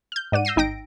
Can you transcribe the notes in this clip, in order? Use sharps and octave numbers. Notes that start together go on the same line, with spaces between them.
F6 G6
G#2 D5 F#5 D#7
E6 G6 A#6 C7 D#7
G#1 D#4 G5 A#6 D7